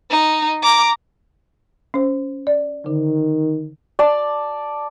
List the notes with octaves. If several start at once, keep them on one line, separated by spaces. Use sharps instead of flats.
D#4
A#5 D6
C#4 C5
D5
D3 D#3
D5 A5